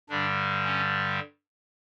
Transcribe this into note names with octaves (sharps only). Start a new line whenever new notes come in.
G2 D3 G3 D4
C#4